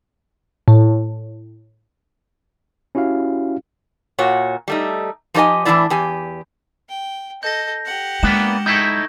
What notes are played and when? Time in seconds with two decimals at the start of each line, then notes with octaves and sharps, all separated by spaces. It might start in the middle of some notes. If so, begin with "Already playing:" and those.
0.68 A2
2.95 C#4 E4 F#4 G4 F5
4.19 A#2 F#4 C#5
4.68 G3 A3 D#4
5.34 F3 D#4 G4 C#5 D#5 G#5
5.65 A2 E3 C#4 D4 E4 D5
5.90 E2 G4 G#5
6.89 G5
7.43 A4 D#5 G6 A#6
7.85 G4 F#5
8.23 G#3 A#3 B3 D4 E7
8.66 D#4 E4 A4 C#6 G6 G#6